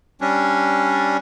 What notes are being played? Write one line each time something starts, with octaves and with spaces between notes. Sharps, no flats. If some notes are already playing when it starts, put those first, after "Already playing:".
G3 C#4 D4